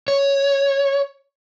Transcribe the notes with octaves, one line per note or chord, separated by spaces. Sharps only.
C#5